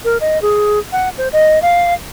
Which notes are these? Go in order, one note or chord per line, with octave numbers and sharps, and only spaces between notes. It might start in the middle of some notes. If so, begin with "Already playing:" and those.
A#4
D#5
G#4
F#5
C5
D#5
F5